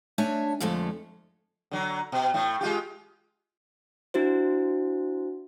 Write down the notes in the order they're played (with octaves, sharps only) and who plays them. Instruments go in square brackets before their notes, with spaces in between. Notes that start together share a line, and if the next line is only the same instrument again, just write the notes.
[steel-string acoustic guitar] A3 D4 C#5 E5 G#5
F2 D3 F3 G#3 A3
[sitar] D3 F#3
B2
A2 A3
G#3 F4 G4
[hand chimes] D4 E4 F#4 C5